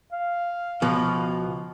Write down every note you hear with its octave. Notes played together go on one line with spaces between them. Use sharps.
F5
C#2 B2 F3